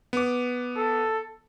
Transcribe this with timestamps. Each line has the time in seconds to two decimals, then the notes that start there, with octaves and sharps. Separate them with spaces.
0.13 B3 D6
0.77 A4